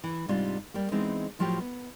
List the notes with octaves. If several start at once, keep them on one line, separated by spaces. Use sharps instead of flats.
E3
G#2 C3 G3 D4 F4
G3 A#3
E3 G#3 B3 C4 D#4
A2 F3 F#3 F4 G4
B3